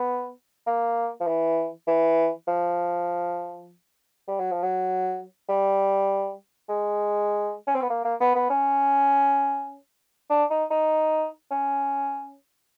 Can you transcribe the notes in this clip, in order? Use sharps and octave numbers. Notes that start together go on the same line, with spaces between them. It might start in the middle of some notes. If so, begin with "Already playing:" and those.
Already playing: B3
A#3
F3
E3
E3
F3
G3
F#3
F3
F#3
G3
G#3
C#4
C4
B3
A#3
A#3
B3
B3
C#4
D4
D#4
D#4
C#4